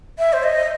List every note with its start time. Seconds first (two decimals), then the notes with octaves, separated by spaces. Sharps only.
0.18 E5
0.33 C5
0.43 D#5